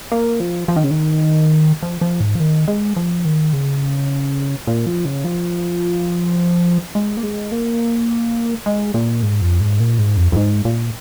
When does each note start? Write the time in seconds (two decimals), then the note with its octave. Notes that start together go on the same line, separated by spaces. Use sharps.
0.12 A#3
0.40 F3
0.68 F3
0.76 D#3
0.84 C#3
0.91 D#3
1.83 F3
2.01 F3
2.20 G#2
2.35 F3
2.40 D#3
2.68 G#3
2.96 F3
3.25 D#3
3.53 C#3
4.67 A#2
4.86 F3
5.05 C#3
5.24 F3
6.95 G#3
7.17 A#3
7.23 G#3
7.52 A#3
8.66 G#3
8.94 A#2
9.23 G#2
9.42 F2
9.61 G#2
9.80 A#2
9.99 G#2
10.17 F2
10.32 F2
10.36 G#2
10.65 A#2